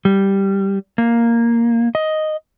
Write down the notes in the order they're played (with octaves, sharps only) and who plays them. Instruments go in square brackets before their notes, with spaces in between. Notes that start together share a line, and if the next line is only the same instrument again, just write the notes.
[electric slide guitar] G3
A#3
D#5